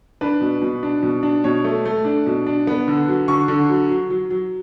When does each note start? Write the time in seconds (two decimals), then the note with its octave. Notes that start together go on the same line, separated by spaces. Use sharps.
0.21 D4 B4
0.41 B2
0.62 B2
0.83 D4
1.03 B2
1.23 D4
1.44 B2 C#5
1.64 A3
1.85 A3
2.05 D4
2.26 B2
2.47 D4
2.67 B3
2.88 D3
3.08 F#3
3.28 D3 C#6
3.48 D3
3.69 F#3
3.90 F#3
4.10 F#3
4.30 F#3